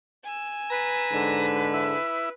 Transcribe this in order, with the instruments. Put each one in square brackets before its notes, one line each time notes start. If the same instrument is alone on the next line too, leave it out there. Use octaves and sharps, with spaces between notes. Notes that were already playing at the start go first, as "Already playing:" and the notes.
[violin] G#5 E6
[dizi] B4 [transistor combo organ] A#5
[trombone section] G#2 D3
[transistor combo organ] E4